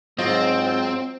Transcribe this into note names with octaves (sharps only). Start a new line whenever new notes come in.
G#2 F#3 C4 F4 D#5